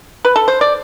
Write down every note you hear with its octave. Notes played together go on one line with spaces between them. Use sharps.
B4
A4
C5
D5